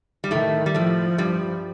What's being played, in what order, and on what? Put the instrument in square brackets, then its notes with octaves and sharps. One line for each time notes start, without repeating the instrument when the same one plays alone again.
[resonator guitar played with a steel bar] G3
[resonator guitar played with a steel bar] A2 A3 [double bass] D#3
[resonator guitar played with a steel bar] G3
[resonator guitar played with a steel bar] A2 A3 [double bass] F3
[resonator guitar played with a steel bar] G2 G3